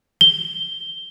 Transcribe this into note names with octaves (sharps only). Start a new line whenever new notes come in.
G7